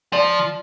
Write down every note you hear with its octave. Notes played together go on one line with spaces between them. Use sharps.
F3 D5